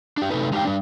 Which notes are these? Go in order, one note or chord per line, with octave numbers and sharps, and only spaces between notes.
D4 G4
C3 G#3 A3 D#4 A4 B4
G#3 D#4 G4 G#4 F5 G5
G3 D4